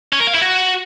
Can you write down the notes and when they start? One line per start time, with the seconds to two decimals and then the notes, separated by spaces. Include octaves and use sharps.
0.13 C#4
0.20 A#4
0.27 F5
0.34 E4
0.42 F#4